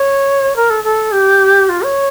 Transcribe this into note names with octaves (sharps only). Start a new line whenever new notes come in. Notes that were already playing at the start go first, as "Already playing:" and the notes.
Already playing: C#5
A#4
A4
A4
G4
F4
C#5